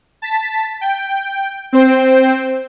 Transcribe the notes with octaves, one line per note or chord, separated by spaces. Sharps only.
A5 B6
G5
C4 C5 G5